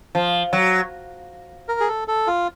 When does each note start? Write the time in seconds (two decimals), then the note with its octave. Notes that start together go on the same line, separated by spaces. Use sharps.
0.15 F3
0.53 F#3
1.69 A#4
1.80 G#4
1.88 A4
2.08 A4
2.27 F4